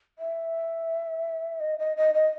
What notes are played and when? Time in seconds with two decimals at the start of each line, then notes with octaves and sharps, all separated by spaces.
0.19 E5
1.60 D#5
1.79 D#5
1.97 D#5
2.14 D#5